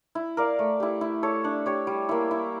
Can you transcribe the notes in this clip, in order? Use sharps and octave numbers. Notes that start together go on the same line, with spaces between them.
E4
A#4 D5 F5
A3
E4 G4
E4
A4 C#5
D4
G4 C#5
G3
A#3 E4
E4